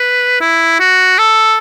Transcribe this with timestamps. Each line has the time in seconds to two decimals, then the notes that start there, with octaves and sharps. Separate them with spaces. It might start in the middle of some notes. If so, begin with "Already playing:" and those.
Already playing: B4
0.40 E4
0.80 F#4
1.19 A4